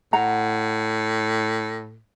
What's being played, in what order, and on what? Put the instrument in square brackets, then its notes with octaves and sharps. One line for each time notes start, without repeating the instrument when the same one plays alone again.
[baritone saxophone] A2 [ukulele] F#5 A#5